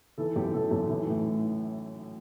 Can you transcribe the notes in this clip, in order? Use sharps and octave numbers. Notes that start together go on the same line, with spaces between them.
E3 A4
F#2 G4
E3 A4
F#2
E3
A2